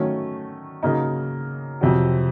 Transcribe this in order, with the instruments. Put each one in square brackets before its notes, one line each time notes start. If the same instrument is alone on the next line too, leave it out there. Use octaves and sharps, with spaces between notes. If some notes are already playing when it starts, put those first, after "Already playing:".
Already playing: [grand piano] D#3 F#3 A3 C#4
C#3 F#3 A#3 D#4
F2 C3 F#3